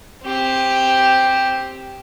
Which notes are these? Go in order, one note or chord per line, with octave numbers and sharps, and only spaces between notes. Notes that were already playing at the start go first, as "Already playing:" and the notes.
C4 G4